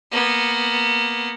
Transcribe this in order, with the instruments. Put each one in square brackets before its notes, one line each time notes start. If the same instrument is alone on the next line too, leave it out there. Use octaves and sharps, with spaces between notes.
[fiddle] A#3 B3